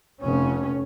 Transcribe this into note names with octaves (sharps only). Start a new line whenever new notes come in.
F1 C#4